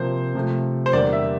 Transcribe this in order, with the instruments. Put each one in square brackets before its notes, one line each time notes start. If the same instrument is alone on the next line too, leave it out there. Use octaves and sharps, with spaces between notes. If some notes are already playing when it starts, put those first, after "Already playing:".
Already playing: [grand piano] C3 F3 A#3 C5
C3 F3 A3
C5
E2 D3 G3 A#3 D5
E5